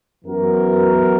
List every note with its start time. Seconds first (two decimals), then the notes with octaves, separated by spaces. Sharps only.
0.24 F#2 E3 B3 F#4 A#4